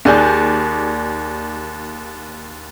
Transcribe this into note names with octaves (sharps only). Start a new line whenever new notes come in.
D#2 G#4 D5 F#6 G6